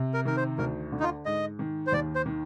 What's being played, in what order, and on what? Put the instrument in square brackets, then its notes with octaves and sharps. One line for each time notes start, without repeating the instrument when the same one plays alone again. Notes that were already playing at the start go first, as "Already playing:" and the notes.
Already playing: [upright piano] C3
[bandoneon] A#4
[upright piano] D#3 [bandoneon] A#4
[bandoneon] C5
[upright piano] D2 [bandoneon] A#4
[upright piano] D3
[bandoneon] D#4
F4
[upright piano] G#2 [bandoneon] D#5
[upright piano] D#3
[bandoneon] C5
[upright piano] D#2 [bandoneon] D5
[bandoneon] C5
[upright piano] D#3